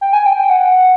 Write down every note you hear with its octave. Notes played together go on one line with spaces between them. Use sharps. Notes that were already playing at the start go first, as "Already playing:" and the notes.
G5
G#5
G5
G5
F#5